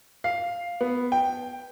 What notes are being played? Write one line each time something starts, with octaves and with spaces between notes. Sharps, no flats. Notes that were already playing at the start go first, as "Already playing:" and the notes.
F5
B3
G5